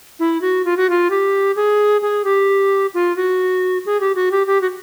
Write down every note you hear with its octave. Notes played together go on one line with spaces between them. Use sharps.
E4
F#4
F4
F#4
F4
G4
G#4
G#4
G4
F4
F#4
G#4
G4
F#4
G4
G4
F#4